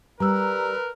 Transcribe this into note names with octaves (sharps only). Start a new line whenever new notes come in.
G3 A#4 B4 A#5 E6